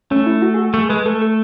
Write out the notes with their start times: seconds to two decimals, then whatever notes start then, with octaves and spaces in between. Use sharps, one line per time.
0.11 A3 C#4
0.26 E4
0.42 F#4
0.54 G#4
0.58 F#4
0.73 A3 G#4
0.89 G#3 B4
1.06 A3 A4
1.22 A4